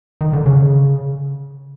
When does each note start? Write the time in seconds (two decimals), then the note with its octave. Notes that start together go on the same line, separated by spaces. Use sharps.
0.21 D#3
0.33 D3
0.46 C#3